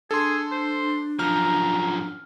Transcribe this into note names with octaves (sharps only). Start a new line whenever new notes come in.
D4 G#4 A4 C6
C5
F#2 F3 A#5 F6